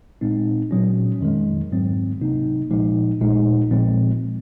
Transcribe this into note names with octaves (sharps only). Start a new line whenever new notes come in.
A#1 A#2 G#3 C4 D#4
A#2 F#3 C#4
F2 D#3 G#3
G#2 F#3 C4
C#2 C3 F#3 A#3 D#4
A#1 A#2 F3 G#3 D#4
A#1 A#2 G#3 D#4
A#2 F3 G#3 C4